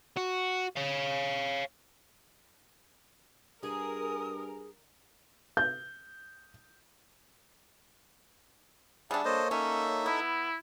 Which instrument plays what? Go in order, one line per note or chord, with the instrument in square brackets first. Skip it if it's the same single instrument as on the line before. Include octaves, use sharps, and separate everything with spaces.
[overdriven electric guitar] F#4
C#5 F5
[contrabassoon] G2 [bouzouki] G#4 [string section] A#4 [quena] D#6
[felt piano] G6
[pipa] G3 D4 [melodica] G#4 [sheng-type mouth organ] E5 F#5 A5
[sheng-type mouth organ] A#3 C#5 [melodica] A4 C5 D#5
[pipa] C#4 [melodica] D#4 A4 E5
[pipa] B3 [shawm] E4